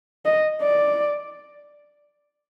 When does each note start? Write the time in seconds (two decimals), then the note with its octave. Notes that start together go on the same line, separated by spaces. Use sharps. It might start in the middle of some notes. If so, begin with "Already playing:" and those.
0.25 D#5
0.62 D5